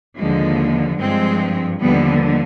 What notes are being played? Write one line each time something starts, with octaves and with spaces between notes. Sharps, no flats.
D#2 D3 F3 G#3
G2 F3 G#3 C4
D#2 D3 F3 G3 B3